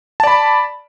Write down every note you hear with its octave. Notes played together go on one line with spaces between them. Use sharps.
D5 A5 B5